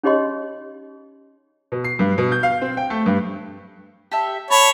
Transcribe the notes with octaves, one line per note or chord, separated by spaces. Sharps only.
C#4 D#4 G4 C#5 D#5 C6
B2
C7
G2
B2
G6
F5
C4
G5
A3
G2
G4 A4 E5
C#5 D5 A5 B5